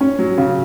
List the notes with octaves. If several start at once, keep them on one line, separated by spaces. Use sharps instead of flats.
C#4
F#3
C#3